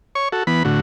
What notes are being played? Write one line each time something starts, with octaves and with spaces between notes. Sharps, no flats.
C#5 C#6
F#4 A4
E3 B3 B5
A2 D3 F#4